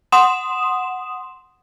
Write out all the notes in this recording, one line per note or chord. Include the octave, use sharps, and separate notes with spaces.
F#5 C6 D#6 E7